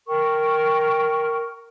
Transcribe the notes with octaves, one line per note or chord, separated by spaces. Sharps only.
A#4 G5 C#6